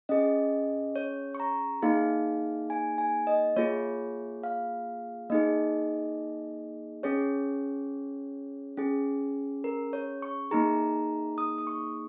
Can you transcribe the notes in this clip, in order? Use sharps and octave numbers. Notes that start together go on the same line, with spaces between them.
C#4 G#4 D#5
C#5
C#6
A#5
A#3 D#4 G#4 F5
G#5
G#5
D#5
A#3 F4 G#4 C#5
F5
A#3 D#4 G#4 D#5
C#4 G#4 C#5
C#4 G#4
A#4
C#5
C#6
A#3 D#4 G#4 A#5
D#6
D#6
C#6